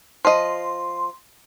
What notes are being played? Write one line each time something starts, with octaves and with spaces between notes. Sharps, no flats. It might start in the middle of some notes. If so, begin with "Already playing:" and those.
F3 D#5 C6